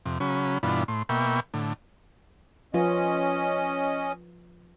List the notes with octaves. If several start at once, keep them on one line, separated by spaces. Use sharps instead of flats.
F2 C3
C#3 F#3 C#4 B5
G2 B2 E3 D4 F4 B5
A2 C6
B2 A#3 E5 G5 B5 C#6
A2 D3
F3 C#4 F4 B4 D#5